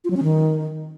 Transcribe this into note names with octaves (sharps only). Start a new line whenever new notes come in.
F4
F#3
C#4
D#3